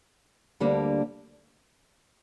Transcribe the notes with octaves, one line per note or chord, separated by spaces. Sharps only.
D2 D3 G3 A#3 D4